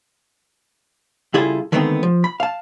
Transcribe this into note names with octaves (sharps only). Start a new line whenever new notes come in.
C#3 G3 E4 F4 G#4 A4
D3 D#3 G#3 A3 B3 C4
F3
B5
F5 A5